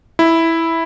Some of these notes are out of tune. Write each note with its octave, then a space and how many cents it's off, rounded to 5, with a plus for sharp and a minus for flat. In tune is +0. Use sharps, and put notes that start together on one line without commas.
E4 -5